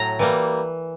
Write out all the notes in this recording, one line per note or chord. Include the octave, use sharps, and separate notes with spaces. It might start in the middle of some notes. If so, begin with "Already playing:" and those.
Already playing: A2 F#3 A#5
E3 G3 A#3